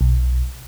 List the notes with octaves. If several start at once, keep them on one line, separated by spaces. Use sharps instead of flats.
B1